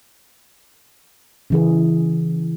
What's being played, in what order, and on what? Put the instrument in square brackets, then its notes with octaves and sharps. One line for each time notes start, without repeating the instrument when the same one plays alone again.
[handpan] C#3 E3 G#4